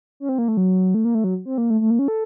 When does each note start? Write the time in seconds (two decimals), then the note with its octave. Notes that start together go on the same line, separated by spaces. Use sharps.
0.20 C#4
0.29 C4
0.38 A#3
0.48 A3
0.57 F#3
0.94 A3
1.05 A#3
1.15 A3
1.24 F#3
1.46 C4
1.58 A#3
1.70 A3
1.81 A3
1.90 A#3
1.99 C#4
2.08 A4